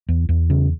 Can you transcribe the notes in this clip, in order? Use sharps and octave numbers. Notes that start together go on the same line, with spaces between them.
E2
E2
C#3